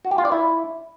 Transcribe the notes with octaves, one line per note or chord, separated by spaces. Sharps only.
F#4
G4
F4
D5
E4